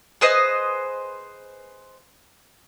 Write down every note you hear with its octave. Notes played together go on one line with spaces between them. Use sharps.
G#4 B4 C5 D#5